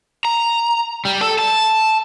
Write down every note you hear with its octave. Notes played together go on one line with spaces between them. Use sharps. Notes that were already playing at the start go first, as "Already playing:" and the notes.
A#5
G3
A4
A5